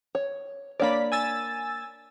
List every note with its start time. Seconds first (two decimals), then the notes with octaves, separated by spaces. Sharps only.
0.15 C#5
0.80 A#3 D4 C#5 D5 B5
1.12 G#5 E6 A6